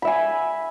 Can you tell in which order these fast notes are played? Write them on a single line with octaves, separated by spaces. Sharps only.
B5 E5 G#5